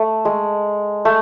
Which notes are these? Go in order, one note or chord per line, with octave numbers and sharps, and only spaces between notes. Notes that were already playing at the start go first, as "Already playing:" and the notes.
Already playing: A3
G#3
A3